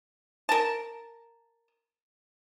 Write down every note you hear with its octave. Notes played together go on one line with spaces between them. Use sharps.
A#4 A5